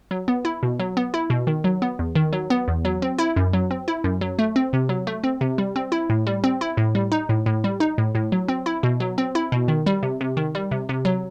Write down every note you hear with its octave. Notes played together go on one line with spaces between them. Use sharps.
F#3
B3
E4
B2
F#3
B3
E4
B2
D#3
F#3
B3
E2
D#3
F#3
B3
E2
F#3
C4
E4
F#2
F#3
C4
E4
F#2
F#3
A3
C4
C3
F#3
A3
C4
C3
G3
C4
E4
A2
G3
C4
E4
A2
G3
D#4
A2
A2
G3
D#4
A2
A2
F#3
C4
E4
B2
F#3
C4
E4
B2
D#3
G3
C3
C3
D#3
G3
C3
C3
F#3